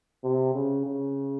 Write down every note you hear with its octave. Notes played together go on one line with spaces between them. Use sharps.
C3
C#3
C#3